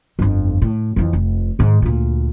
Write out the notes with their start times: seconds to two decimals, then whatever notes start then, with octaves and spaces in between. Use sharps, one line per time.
0.19 G1 F2
0.62 A2
0.96 F2 E3
1.13 F1
1.59 G#2 D#3
1.82 D2 A#2